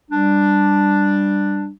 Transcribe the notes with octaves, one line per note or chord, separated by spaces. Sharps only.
G3 D4